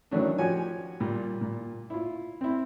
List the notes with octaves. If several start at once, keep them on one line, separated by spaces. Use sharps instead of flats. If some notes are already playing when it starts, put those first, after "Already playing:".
D#3 E3 F#3 A3 C#4 D4
F3 F#4 G4 C#5 G#5
A#2 G3
A#2
E4 F4
C4 E4